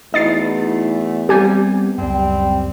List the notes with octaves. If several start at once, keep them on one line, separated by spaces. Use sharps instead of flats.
E2 A3 D#4 E4 F#4 D#5 A6 C7
G3 B3 C4 G4 G#5
C#2 F#2 G3 C4